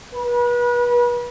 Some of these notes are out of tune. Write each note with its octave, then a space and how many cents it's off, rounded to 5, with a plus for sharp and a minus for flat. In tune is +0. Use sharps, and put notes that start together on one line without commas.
B4 -35